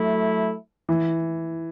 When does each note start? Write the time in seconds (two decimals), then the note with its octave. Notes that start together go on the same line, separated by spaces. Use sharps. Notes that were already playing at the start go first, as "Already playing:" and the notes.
Already playing: F#3 A3 E4
0.89 E3